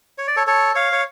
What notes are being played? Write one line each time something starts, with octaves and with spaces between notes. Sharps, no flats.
C#5
D5
A4 C#5
A4 C#5
C#5 F5
C#5